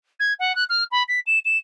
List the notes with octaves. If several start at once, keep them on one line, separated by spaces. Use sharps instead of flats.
G#6
F#5
F#6
F6
B5
B6
E7
E7